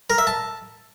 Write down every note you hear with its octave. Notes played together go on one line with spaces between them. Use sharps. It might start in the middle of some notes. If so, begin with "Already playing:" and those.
A#4
E5
A5